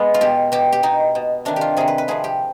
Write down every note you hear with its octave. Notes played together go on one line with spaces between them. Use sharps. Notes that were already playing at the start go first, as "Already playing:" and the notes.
Already playing: G#3 B3
F4
B2 G4
B2 G4
G4
B2 D#4
B2
C3 D#3 D4
F4 G4
C3 D#3 G#4
B4
B4
C3 F3 G#4
G4